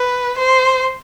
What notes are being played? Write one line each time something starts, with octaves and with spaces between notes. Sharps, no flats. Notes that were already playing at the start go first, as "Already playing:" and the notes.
Already playing: B4
C5